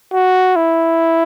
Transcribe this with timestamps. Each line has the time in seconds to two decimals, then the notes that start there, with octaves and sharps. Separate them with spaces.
0.14 F#4
0.56 E4